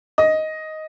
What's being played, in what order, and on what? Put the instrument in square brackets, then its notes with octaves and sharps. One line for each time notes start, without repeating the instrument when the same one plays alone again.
[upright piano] D#5